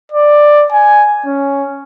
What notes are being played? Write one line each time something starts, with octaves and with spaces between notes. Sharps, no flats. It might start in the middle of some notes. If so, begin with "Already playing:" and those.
D5
G#5
C#4